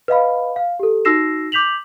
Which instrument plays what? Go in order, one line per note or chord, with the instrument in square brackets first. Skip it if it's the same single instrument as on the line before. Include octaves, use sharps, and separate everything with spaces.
[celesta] B4 D#5 F5 B5
F5
G4 A4
D#4 F#4 E6 A#6 C7 E7
D6 G6 B6 F7 F#7